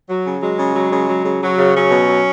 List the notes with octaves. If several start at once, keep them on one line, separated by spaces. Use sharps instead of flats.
F#3
C#3
F#3 G#3
C#3
F#3
C#3
F#3
C#3
F#3
C#3
F#3 C#4
B2
F#3